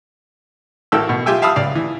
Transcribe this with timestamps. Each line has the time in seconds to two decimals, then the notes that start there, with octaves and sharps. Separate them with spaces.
0.92 A1 F#4 A4 A#4 G5 E6
1.09 B2
1.26 F4 G4 E5 G5 G#5 E6
1.42 E5 F5 A5 B5 D#6 E6
1.56 C#2 D5 F5
1.75 E3